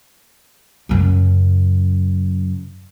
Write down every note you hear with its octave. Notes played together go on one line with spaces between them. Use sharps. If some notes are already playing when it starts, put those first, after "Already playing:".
F#2 C#3